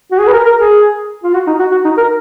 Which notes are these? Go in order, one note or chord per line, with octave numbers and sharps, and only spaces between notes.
F#4
G#4
B4
A#4
A#4
G#4
F4
F#4
D#4
F#4
F#4
D#4
A#4